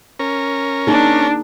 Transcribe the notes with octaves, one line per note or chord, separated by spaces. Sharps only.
C#4 A#4
A#3 D4 D#4 G#4